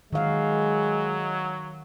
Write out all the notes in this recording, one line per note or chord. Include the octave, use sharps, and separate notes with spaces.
D#3 F#3 G#3 F5